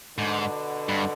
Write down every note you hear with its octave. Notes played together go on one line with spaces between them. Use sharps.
G#2 B2 D3
G2